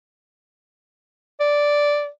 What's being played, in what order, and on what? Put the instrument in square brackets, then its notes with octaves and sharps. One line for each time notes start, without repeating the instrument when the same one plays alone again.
[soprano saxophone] D5